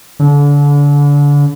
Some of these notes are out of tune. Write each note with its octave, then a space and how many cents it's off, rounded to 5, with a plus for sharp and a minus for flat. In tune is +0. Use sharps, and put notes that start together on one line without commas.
D3 -30